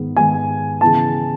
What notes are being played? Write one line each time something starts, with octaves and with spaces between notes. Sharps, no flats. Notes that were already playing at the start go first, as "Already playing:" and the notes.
Already playing: G#2 D#3 G#3 B3
G#2 D#3 G#3 B3 G#5
C#3 E3 B3 A5